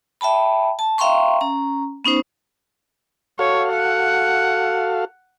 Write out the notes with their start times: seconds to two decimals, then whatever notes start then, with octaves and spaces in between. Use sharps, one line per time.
0.21 E5 G5 A5 B5
0.79 A5
0.98 E5 F5 G5 A#5 C6 C#6
1.41 C#4 A#5
2.05 B3 C#4 D#4 C5
3.39 F#4 A4 C#5 F5
3.73 F#5